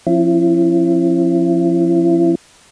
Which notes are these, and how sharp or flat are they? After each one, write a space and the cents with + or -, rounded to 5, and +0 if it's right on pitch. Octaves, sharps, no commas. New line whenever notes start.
F3 +0 C4 +45 E4 +35